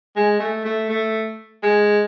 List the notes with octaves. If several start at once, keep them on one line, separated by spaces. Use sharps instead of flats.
G#3
A3
A3
A3
G#3